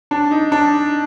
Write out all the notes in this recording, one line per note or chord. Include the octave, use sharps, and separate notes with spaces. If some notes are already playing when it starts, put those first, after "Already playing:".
D4
D#4
D4